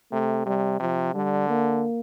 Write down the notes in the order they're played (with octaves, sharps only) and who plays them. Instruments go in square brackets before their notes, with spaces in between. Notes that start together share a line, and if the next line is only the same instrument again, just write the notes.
[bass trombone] C3 [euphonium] A3
[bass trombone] C3 [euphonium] G3
[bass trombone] C3 [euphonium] F3
[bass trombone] D3 [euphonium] G3
[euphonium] A#3